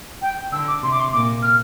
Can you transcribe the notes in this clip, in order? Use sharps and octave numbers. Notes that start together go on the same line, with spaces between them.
G5
D3 E6
D6
C3 C6
D6
C6
A#2 D6
F6